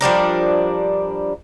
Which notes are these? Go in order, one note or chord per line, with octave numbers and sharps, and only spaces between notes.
F3 G3 D4 A#4